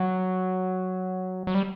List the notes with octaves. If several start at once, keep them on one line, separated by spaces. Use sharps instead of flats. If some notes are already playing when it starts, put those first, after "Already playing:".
Already playing: F#3
F#3
G3